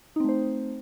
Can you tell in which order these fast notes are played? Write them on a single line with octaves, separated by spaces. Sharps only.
D#4 C4 A3 C5